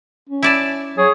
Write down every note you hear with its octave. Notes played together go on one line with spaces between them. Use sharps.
C#4
E4 D5 A5
F#3 G#4 C#5